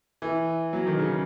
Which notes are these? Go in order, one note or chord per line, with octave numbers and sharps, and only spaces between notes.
E3
F#3
D#3
C#3